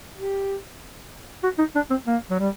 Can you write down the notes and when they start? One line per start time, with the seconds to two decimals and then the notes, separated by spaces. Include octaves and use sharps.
0.17 G4
1.43 F#4
1.59 D#4
1.75 D4
1.90 C4
2.07 A#3
2.30 F#3
2.39 G3